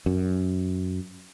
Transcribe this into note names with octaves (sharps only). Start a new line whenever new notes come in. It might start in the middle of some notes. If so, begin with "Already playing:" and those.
F#2